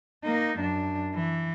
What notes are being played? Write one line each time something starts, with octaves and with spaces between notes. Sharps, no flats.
A#3 D#4
F#2 D4
E3